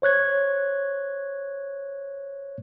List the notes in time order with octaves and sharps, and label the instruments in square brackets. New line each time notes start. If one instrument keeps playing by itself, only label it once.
[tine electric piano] C5 C#5 F#6 G#6